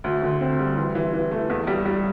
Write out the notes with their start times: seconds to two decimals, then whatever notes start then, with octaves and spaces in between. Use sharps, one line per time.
0.04 D2
0.22 D3
0.41 C4
0.59 G3
0.77 E3
0.95 E3
1.13 E3
1.31 A3
1.50 E2
1.67 G3
1.86 G3